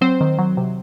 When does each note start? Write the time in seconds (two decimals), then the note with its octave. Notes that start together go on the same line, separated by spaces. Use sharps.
0.01 F#3 C4 C5
0.21 D#3
0.39 F#3
0.57 C3